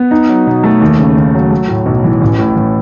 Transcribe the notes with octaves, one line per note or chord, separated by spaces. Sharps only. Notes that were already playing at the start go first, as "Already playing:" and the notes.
Already playing: B3
D#4
F#3
B2
A3
D#2
C#3
D#2
F#3
A3
A2
B1
E3
A1
A2
A1